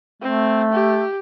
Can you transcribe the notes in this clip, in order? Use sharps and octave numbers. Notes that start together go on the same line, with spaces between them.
A3 C4
G4